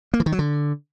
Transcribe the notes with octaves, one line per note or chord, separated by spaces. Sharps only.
A#3
E3
D#3
F#3
D3